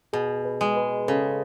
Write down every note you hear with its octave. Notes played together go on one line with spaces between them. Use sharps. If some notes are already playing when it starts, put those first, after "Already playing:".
B2 G#4
B4
G#3
B4
C#3 A4